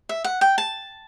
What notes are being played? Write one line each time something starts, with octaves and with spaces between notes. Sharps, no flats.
E5
F#5
G5
A5